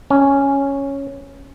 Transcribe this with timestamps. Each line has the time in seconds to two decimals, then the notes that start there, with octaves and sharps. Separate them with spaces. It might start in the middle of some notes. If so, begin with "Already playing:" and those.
0.10 C#4